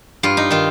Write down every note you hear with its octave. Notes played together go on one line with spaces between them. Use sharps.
G2 F4
D#4
D#3 F4